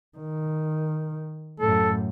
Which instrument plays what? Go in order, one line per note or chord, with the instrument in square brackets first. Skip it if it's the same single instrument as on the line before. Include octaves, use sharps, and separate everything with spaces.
[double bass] D#3
[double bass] F#2 A2 [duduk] A4